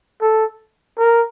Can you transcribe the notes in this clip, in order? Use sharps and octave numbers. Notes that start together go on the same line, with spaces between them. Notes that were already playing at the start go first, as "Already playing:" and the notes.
A4
A#4